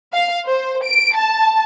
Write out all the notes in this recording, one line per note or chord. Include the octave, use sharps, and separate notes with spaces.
F5
C5
D7
A5